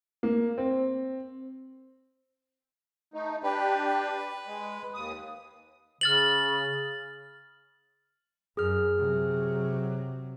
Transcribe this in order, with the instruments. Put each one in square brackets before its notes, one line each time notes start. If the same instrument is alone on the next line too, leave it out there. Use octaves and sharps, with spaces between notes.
[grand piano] A#3
C4
[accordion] A3 D#4
[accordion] D4 G4 [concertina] B4
[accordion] G#3
D#2 D#6
[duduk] C#3 [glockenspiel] F6 A6 F#7
[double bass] F#2 [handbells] G#4 F6
[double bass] C3 F#3